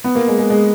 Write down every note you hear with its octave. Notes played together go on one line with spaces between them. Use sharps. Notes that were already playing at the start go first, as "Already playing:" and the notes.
B3
A#3
G#3
G#3
G#3